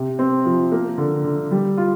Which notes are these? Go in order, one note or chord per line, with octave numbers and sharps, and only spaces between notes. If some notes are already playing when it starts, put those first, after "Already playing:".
Already playing: C3
C4
F3
A#3
D3
D3
G3
F4